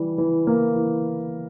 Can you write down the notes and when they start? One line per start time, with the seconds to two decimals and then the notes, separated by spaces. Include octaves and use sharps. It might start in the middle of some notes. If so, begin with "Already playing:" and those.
Already playing: E3 G3
0.18 E3
0.47 A#3
0.76 E3